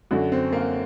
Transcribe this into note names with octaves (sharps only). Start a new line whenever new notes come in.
F#2 D3 F#4
C4
A#3